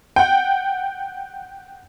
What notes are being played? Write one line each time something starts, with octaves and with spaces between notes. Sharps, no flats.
F#5 G5